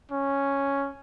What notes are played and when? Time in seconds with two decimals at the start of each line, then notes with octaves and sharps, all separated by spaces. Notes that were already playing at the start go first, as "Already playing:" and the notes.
0.11 C#4